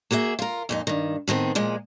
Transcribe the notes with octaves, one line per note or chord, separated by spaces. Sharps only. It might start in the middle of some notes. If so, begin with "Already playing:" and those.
A#3 F#4 G#4 E5
F4 A#4
F2 A#2 D#4
G2 D#3
A2 D#3 B3 C4
A#2 F3 G#3